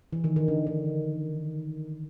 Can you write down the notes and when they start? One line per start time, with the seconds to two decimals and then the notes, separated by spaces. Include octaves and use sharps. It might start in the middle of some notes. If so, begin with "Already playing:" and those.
0.13 E3
0.24 D#3
0.36 D#3
0.48 D3
0.67 D#3